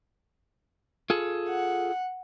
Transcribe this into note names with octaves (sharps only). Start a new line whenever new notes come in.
F4 G#4 A4
F#5